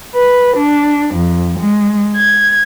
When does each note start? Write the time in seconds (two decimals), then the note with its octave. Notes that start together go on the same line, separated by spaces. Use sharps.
0.14 B4
0.57 D4
1.15 F2
1.60 G#3
2.16 G#6